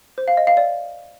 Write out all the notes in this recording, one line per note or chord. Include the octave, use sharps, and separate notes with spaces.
C5
F5
D#5
F5
D5